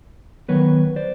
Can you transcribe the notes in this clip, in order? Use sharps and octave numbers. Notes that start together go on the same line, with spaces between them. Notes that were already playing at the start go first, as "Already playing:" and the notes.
D#3 F#3 B3 B4 C#5
C5 D5